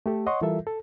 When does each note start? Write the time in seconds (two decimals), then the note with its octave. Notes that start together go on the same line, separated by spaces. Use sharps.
0.06 A3 G4 A4
0.26 C#5 D#5 F#5 C6 C#6
0.41 E3 G3 F4 A4 A#4 E5
0.67 A4